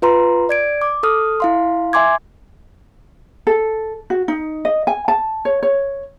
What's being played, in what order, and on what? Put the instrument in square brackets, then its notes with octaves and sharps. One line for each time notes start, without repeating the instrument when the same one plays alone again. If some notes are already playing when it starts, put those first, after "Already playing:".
[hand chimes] F4 B4 A#5 C6
D5 G#6 D7
D6
A4 D#6 F6
E4 F5 C6
E5 G#5 C6 D6 G#6
[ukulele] A4
F#4
D#4
D#5
G#5
A5
C#5
C#5